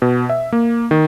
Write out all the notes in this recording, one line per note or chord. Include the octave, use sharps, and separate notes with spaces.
B2
E5
A#3
D#3